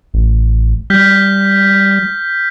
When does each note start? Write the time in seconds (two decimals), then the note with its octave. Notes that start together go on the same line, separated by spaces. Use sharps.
0.14 A1
0.90 G3 F6 G6 B6